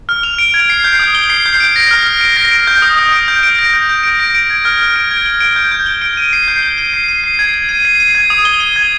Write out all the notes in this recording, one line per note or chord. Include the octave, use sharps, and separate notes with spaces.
F6
F7
D7
G#6
C7
G6
D#6
G7
C7
G6
D7
A#6
F6
F6
D7
A#6
D7
G6
D#6
D#6
D7
G6
D7
A#6
G6
G6
D7
A#6
D7
G#6
F6
F6
D7
G#6
G7
D7
G6
G6
G7
D7
D#7
C7
G6
G7
D#7
C7
D#7
C7
G#6
G#6
D#7
C7
D#7
G#6
D#6
G7
D#7
G#6